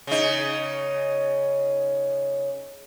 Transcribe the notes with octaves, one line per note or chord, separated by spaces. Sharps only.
C#3 D#4